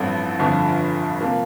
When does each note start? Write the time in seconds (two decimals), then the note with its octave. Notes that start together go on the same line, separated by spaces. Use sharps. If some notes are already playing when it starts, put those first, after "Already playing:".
Already playing: A1 G2 F3 A3 C4
0.39 G1 F2 D3 F3
1.21 C3 F3 A#3